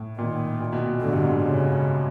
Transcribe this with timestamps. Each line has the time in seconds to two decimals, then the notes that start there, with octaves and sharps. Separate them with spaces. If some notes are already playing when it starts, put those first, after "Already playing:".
Already playing: A2
0.18 A#2 D#3
0.60 A#2
0.73 B2
0.85 A#2
1.01 A2 D3
1.13 G2
1.23 G#2
1.43 C#3